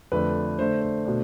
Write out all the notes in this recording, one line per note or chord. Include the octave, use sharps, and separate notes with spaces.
F2 D3 A3 D4 B4
D3 A3 D4 C5
C5
B2 A3 D4